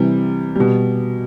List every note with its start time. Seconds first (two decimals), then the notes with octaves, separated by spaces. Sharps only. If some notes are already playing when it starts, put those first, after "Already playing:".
Already playing: C3 E3 G3
0.56 B2 G3